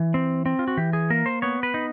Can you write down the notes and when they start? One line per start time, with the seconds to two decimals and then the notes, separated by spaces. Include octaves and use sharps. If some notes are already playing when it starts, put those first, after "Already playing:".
Already playing: E3
0.14 C4
0.46 C4
0.59 F4
0.68 F#4
0.77 E3 G4
0.93 G#4
1.10 A#3 A#4
1.26 C5
1.42 B3 C#5
1.63 B4
1.74 D#4